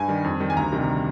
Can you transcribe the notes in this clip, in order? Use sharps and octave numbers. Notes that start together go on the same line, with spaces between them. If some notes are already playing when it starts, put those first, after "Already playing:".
Already playing: G2 G#5
D#3 G3
F2
D#3 G3
G#5
D2 A#5
C3 D#3 G3